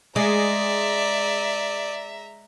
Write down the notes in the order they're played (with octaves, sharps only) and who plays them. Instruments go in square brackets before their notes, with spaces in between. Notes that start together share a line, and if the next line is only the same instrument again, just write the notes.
[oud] G#3 [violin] D5 [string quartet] E5 A#5